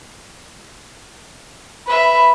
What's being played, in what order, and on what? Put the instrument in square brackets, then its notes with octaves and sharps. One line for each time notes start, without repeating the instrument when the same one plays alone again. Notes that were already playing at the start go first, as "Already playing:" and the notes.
[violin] B4 E5 [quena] B5